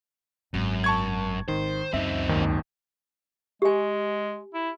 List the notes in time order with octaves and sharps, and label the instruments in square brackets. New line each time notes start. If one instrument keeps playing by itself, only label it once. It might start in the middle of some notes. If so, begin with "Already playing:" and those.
[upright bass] G#1 [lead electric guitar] F#2
[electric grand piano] A5 C#6 G#6
[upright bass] G#1 [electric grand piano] D#3 [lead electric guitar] C5
[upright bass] C#2 F#2 [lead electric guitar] C4 D#4 [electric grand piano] E5
[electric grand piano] G#1 D#2 D#3
[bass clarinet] G#3 [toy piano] G4 G#5
[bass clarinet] E4